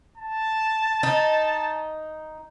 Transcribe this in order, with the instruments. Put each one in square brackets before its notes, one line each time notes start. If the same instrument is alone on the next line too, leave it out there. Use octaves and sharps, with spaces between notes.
[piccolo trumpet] A5
[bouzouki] D#4